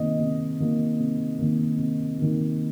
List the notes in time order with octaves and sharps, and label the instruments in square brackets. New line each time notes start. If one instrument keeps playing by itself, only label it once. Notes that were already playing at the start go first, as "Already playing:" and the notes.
Already playing: [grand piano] C3 D#3 A#3 D#5
C3
D#3 A#3
C3
D#3 A#3
C3
D#3 A#3